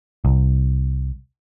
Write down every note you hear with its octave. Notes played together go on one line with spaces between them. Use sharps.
C2